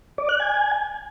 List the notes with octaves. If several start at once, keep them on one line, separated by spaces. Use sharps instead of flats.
D5
F#6
G#5